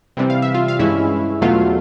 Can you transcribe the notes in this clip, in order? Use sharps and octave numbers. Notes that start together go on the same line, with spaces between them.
C3 E3 G3 C4
F5
E5
F4 F5
F5
G2 E3 G#3 C#4 E4 E5
E2 B2 F#3 A3 F4 F5